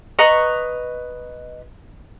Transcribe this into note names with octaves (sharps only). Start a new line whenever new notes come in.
B4 D#5 A#5 C#6